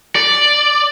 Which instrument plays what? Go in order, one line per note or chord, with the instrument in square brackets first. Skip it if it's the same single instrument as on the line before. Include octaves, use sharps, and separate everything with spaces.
[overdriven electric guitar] D5